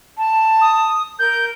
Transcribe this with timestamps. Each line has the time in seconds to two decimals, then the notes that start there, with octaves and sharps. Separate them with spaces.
0.17 A5
0.61 D#6
1.19 A#4 G6